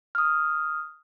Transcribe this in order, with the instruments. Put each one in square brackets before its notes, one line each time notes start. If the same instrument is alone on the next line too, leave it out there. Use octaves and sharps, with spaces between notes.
[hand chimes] D#6 F6